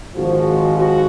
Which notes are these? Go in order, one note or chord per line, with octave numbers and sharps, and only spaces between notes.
G#1 G#2 F3 F#4
F#4